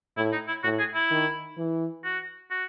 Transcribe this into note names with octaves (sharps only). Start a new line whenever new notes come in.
A2 E4
D#4
E4
A2 F#4
G#4
E4
D#3
E3
F#4
F#4